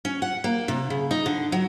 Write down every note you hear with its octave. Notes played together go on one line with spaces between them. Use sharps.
C#4
F#5
A#3
C3
C#3
D#4
D3
F#3